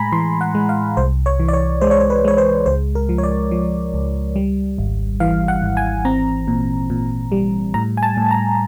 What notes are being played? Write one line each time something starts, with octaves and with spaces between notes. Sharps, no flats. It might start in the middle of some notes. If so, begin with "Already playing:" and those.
Already playing: A2 G#3 G#5 A#5 B5
E3 C6
F#5
G#3
F5
C2 C5
C#5
E3
D5
C#5
G#3 C5
C#5
C5
B4
G#3 C#5
C5
C#2 C5
A#4
F3
C#5
D5
F3
C#2
G3
G#1
E3 F5
F#5
G#1
G#5
C4 A#5
A#2
A#2
G3
A2 A#5
G#5
A5
A2
A#5